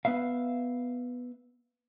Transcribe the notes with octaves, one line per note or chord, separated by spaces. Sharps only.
B3 B4 E5 F5